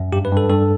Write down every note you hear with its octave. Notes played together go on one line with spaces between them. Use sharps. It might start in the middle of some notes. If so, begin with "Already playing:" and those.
Already playing: F#2
G2 G4
B4
G2
A4
G2 A4